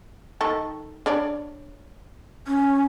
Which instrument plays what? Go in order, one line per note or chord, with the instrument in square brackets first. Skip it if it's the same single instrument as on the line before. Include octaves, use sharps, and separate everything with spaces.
[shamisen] D#3 A4
D4 C#5 D5
[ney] C#4